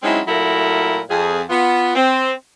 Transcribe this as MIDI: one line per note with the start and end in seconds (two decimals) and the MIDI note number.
0.03 0.19 54
0.03 0.19 56
0.03 0.19 60
0.03 0.19 61
0.03 0.19 63
0.03 0.19 64
0.27 0.99 46
0.27 0.99 54
0.27 0.99 57
0.27 0.99 64
0.27 0.99 69
0.27 0.99 70
1.09 1.41 41
1.09 1.41 68
1.49 1.90 59
1.49 1.90 65
1.95 2.31 60